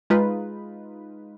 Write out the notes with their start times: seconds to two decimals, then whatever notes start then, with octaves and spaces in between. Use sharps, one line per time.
0.10 G#3 D#4 F4 B4